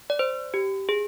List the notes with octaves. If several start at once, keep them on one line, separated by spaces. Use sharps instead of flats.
D5
C5
G4
G#4